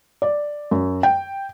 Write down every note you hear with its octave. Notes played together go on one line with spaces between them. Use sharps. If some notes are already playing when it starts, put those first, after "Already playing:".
D5
F#2
G5